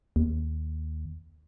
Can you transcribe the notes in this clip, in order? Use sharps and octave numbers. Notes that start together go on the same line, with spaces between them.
D#2